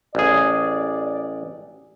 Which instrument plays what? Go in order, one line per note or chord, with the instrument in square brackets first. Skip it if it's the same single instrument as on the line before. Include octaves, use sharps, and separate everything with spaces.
[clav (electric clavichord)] A1 G#4 [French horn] D5